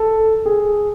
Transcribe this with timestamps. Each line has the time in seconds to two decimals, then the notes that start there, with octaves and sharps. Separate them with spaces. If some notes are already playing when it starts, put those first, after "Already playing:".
Already playing: A4
0.46 G#4